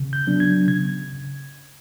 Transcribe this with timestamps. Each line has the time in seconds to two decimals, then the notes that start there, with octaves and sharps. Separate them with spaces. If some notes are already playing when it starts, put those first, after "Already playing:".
Already playing: C#3
0.13 G6
0.27 F#3 B3 D4
0.40 G#6
0.67 C#3 G#6